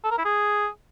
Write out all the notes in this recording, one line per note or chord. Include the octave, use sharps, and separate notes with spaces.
A4
A#4
E4
G#4